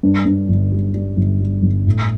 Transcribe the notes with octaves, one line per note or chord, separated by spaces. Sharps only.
G2
G2
G1
G3
G3
G1
G3
G1
A2